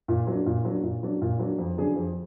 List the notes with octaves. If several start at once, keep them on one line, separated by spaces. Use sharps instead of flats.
A#2
F#3 D4
A#2
F#3 D4
A#2
F#3 D4
A#2
F#3 D4
F2
D3 F#3 D4 G#4
F2